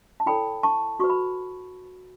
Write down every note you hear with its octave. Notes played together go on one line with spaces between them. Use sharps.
A5
E4 A4 C#5 G5 B5
A5 C#6
F#4 B4 C#6
B5